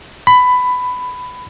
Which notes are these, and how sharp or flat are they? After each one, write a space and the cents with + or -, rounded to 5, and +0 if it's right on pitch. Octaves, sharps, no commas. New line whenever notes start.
B5 +15